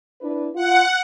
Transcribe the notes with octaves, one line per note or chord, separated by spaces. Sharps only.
D4 E4 B4
F4 F#5